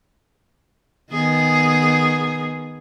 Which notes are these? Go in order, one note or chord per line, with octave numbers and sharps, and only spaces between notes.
D#3 B3 G#4